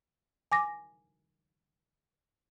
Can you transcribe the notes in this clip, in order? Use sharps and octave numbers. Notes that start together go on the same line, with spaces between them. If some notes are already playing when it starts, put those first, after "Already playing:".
G#5 D6 A#6